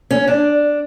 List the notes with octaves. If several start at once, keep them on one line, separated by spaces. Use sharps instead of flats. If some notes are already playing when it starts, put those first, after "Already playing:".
C#4
D4